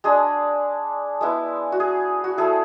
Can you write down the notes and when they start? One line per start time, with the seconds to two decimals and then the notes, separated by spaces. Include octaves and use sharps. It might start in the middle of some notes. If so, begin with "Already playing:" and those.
0.04 G#3 D4 G#4
1.21 G#3 B3 E4
1.72 F#4
1.80 G#4
2.24 F#4
2.37 A3 E4 G#4